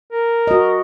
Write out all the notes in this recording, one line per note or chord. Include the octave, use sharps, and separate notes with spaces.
A#4
F#4 D#5